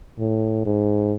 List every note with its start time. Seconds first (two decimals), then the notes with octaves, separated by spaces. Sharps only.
0.19 A2
0.65 G#2